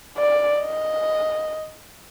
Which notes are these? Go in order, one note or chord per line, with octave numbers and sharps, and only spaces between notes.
D5
D#5